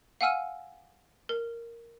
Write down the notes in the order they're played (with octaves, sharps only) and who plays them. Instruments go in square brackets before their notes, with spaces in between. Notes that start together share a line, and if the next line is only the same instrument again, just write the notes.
[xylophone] F5 F#5 G#5 E6 F6 D#7
A#4